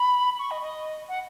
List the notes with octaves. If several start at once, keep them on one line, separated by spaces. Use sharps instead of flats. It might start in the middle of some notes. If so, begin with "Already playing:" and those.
Already playing: B5
C#6
D#5
D#5
F#5